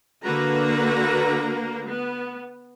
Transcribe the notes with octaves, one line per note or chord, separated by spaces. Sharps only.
D3 A#3 F#4 B4 A#5
B3